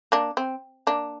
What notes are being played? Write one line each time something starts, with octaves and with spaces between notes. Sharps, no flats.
A#3 D4
C4
A#3 D4